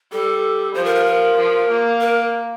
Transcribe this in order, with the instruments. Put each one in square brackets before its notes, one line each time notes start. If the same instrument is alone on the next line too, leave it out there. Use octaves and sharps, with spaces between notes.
[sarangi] G3 [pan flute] A4
[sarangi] F3 [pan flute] C5
[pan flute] A#4
A#4
A#4
[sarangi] F3
A#3
[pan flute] A#4